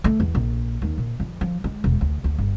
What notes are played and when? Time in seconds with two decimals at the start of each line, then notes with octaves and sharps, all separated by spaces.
0.04 A3
0.20 E2
0.35 A#1
0.82 D#2
0.98 A#2
1.20 F2
1.41 F3
1.64 G#3
1.84 E1
2.01 D2
2.24 D2
2.38 G1